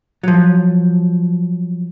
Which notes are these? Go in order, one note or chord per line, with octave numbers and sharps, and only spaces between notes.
F3 F#3